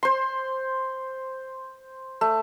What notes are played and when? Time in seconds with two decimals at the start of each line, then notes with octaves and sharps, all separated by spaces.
0.03 C5 C6
2.21 A3